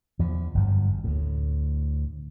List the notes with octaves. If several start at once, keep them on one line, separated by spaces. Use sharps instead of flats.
E2 F3
G1 F#2
D2 A2